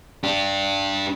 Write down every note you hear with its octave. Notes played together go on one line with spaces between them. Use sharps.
D4 G4